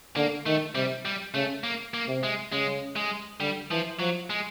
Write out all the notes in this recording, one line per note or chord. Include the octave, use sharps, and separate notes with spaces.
D3 A#3
D#3 A3
C3 G3
G3
C#3 A3
A#3
A#3
C3
G#3
C#3 G#3
G#3
D3 G3
E3 F3
F3 F#3
G#3